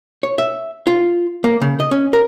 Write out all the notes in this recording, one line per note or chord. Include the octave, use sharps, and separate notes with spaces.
C#5
E5
F4
A#3
C#3
D#5
C#4
A#4